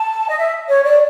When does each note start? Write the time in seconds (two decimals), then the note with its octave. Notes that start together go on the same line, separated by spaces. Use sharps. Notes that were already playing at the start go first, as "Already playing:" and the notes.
Already playing: A5
0.28 D#5
0.38 E5
0.68 C#5
0.83 D5